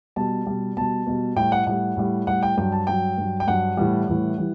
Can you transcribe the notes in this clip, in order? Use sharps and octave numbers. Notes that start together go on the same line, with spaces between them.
B2 G3 A5
B2 G3
B2 G3 A5
B2 G3
A2 G3 G5
F#5
A2 G3 F#5
A2 G3
A2 G3 F#5
G5
G2 F#3 G5
A5
G2 F#3 G5
G2 F#3
G5
G2 F#3 F#5
A2 E3 G3
A2 E3 G3
E3 G3